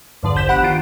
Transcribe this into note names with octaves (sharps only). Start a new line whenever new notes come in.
E2 G2 D3 F3 D5
A#1 C5 G6 B6 E7
G1 G4 F#5 B5 F#6
D#3 F4 D7